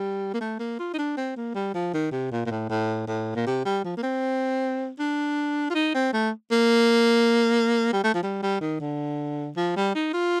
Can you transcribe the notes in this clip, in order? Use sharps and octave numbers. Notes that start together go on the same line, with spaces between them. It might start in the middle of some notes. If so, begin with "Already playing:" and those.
Already playing: G3
A#3
A3
A#3
F4
D#4
D4
C4
A#3
G3
F3
D#3
C3
A#2
A#2
A2
A2
A2
A#2
C3
G3
F3
A#3
C4
D4
F4
D#4
C4
A3
A#3
G3
A3
F3
G3
G3
D#3
D3
F3
G3
D#4
F4